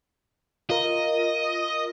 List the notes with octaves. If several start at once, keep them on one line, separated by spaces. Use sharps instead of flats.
F4 A#4 D#5